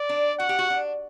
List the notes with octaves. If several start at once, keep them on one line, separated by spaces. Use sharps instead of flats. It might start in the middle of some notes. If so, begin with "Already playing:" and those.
Already playing: D5
D4
F#4 F#5
G4
F#4
D4